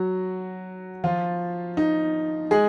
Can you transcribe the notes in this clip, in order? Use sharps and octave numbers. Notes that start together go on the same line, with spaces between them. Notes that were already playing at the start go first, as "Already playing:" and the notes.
Already playing: F#3 F#4
F3 F4
D#4
G#3 G#4